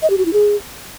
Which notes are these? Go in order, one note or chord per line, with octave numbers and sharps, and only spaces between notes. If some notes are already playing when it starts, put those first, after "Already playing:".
D#5
G4
F#4
E4
G#4